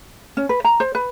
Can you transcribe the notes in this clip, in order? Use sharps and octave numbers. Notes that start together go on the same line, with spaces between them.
C#4
B4
A#5
C5
B4